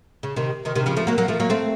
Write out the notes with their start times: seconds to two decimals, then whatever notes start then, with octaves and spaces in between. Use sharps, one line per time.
0.23 C#3
0.36 C3 D#3
0.65 C3 D#3
0.75 C3 D#3
0.86 C#3 F3
0.96 F3 A3
1.07 F#3 A#3
1.18 F#3 A#3
1.28 F3 A3
1.40 F#3 A#3
1.50 A3 C4